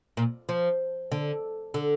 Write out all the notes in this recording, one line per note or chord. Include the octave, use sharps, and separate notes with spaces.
A#2
F3
D3
D3